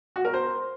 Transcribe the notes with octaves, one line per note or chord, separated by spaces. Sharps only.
F#4
A#4
C5